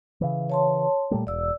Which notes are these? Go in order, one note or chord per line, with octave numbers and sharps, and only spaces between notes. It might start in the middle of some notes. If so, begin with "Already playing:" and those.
C#3 E3
C#5 A5 C6
A#2 G3 A3
E1 D5 E6